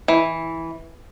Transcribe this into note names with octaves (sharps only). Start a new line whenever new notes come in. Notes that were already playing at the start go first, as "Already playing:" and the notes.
E3